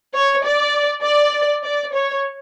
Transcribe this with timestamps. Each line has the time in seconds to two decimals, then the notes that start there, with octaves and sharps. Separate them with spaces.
0.14 C#5
0.44 D5
1.04 D5
1.64 D5
1.94 C#5